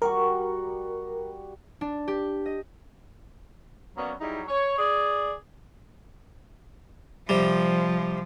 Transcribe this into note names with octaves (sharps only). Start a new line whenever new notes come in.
G3 F#4 A#4 C#6
D4
G4
D#5
F#3 A#3 B3 C#4 D5
F#3 G3 D#4 E4 G#4
C#5
G#4 D5
C3 F3 G3